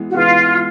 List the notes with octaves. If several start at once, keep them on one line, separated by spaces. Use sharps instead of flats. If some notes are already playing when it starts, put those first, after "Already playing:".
Already playing: E3 G#3 B3
F#4
E3 G#3 B3 F4